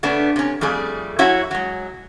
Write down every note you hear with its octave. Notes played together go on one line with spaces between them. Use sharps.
C#3 A3 B3 D4
C3 C#4
F2 G3 A3 G#4
F#3 C#4 E4 F#4 C#5 E5
F#3 G#3